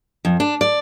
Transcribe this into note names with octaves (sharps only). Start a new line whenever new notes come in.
F2
D4
D5